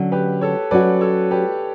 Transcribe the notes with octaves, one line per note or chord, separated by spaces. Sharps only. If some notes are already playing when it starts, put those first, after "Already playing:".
Already playing: D3 F#3 C#4
G4 B4
A4 C#5
F#3 C#4 F#4 B4 D5
A4 C#5
G4 B4